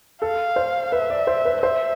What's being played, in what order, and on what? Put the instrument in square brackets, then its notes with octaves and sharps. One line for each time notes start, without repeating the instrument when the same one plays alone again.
[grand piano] A4 [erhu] F5
[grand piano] C5
[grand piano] B4 [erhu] E5
[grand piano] D5
C5
B4
[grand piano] C5 [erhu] E5